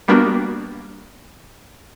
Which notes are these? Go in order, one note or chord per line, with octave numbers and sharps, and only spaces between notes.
G3 A#3 B3 D4 F#4